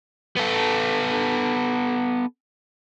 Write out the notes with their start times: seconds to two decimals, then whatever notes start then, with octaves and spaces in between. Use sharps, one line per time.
0.37 B3 A4